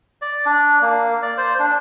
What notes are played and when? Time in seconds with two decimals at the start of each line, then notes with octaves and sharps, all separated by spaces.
0.22 D5
0.46 D4
0.82 A#3
1.22 D5
1.38 C5
1.59 D4